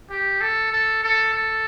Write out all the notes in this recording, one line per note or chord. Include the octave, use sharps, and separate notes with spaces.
G4
A4
A4
A4
A4